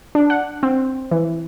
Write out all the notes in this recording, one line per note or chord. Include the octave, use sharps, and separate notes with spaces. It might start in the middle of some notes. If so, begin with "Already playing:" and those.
D4
F#5
C4
E3